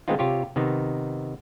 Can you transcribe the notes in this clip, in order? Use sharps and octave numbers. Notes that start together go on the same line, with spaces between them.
D#3 G#3 B3 C4 D#4 F4
C3 F4 G4 C#5
C3 D#3 B3 D#4